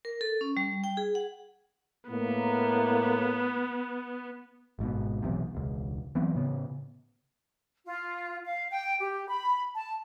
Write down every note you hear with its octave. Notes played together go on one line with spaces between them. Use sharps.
A#4
A4
C#4
G3
G5
G#4
F#5
A2 A#3 B3
G#1 G#2 B2
B1 E2 C3
E1 C#2
E3 F#3 B3 C4
A2 C#3 B3
F4
F5
G5
G4
B5
A5